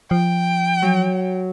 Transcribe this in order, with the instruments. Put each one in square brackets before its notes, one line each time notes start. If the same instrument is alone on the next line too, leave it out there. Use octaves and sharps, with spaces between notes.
[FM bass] F3 [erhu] G5
[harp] F#3